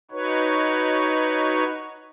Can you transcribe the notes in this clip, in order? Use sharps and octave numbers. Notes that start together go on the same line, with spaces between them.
D#4 F#4 B4 C#5